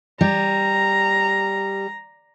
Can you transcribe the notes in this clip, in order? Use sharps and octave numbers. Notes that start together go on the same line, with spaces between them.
G3 A#5